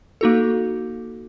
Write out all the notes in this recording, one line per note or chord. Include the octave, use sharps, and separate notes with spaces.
A#3 D#4 F#4 A4